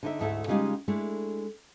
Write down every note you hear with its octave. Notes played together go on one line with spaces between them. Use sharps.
D3 D#4 E5
D2 G#2 A3 E4 A4 E5
C#3 G3 G#3 D#4 F4 G4
G#3 A3 D4 E4